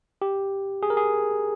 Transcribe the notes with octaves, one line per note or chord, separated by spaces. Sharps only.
G4
G#4
A#4
G#4